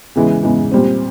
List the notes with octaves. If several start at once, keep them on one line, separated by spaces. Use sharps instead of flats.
E2 C#3 E3 G#3
E2 C#3 E3 G#3
A#2 G3 C4